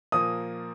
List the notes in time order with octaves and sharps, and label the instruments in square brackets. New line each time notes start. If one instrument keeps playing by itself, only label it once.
[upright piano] A#2 F3 A#3 [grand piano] D#6